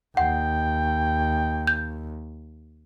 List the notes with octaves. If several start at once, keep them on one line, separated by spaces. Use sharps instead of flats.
D#2 F#5 G5
G6